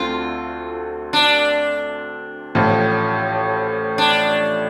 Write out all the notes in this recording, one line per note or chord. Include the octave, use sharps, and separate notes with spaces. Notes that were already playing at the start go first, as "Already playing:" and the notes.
Already playing: D2 D3 A3 C4 F4
D4
A1 A2 F3 A3 F4
D4